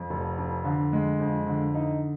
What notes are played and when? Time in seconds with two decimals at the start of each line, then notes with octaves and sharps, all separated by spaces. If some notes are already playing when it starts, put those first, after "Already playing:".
Already playing: F2
0.10 F1
0.38 F2
0.65 D3
0.93 G#3
1.20 F2
1.47 D3
1.74 D#4